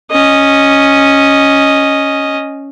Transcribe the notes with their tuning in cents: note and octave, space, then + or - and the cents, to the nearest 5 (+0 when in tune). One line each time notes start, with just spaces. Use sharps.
C#4 +0 D#5 +0